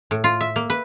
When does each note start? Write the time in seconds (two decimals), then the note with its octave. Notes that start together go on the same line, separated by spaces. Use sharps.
0.11 A2
0.24 F4
0.41 E5
0.56 A#3
0.70 B4